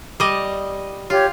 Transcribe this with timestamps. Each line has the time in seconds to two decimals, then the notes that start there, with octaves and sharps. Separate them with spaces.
0.20 G3 D#5
1.10 F4 G4 C#5